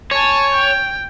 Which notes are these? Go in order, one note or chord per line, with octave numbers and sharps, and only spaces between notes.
C#5 G#5 A5
G5